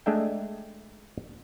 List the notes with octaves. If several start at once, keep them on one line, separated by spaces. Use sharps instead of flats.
G#3 A3 D4 E5 G5